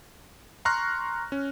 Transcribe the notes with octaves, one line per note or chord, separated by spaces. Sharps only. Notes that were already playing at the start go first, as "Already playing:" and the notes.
A#5 C6 C#6 F6 F#6 A#6
C#4